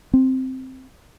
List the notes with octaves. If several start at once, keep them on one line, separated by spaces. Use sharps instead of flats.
C4